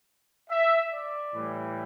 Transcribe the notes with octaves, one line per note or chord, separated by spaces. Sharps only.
E5
D5
A2 E3 G3